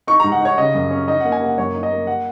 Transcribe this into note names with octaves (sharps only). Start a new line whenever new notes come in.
D#4 C#6
A#5
G#2
F#5
D#4 C#5
C#3 D#5
F#2
C#4
D#4 D#5
F#5
A#3
G#5
A#3 F#5
F#2 C#5
D#4
D#5
A#3
F#5